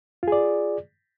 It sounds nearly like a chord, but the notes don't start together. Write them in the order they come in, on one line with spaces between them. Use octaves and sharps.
F4 G#4 D5